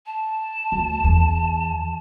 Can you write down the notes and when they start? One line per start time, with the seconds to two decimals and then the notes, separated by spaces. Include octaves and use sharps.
0.06 A5
0.72 D2
1.04 E2